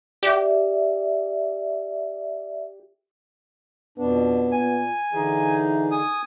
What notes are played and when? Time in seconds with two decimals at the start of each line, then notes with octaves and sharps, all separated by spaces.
0.23 G4 D5 E5
3.98 F2 B2 B3 D4
4.52 A#2 G#5
5.13 D3 E3 D#4 G#4
5.91 G#5 D#6